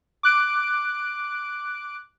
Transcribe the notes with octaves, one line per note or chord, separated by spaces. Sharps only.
D6 F#6 D7